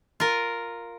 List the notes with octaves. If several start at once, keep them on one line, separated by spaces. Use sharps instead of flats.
F4 A#4